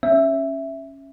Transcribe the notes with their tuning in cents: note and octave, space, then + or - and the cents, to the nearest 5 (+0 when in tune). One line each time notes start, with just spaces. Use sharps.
C#4 -10 E5 +0